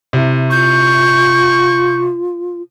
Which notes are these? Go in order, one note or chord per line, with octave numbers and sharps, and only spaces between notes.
C3 E4
F4 C#6 G6